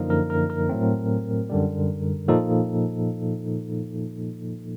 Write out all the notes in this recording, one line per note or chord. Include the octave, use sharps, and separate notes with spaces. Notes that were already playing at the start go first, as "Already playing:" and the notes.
Already playing: F#2 D3 F3 A#3 D#4 A#4
A#4
A#4
A#4
A2 F#3 A3 C4
F#2 D3 G3
A#2 F3 A#3 D#4 A4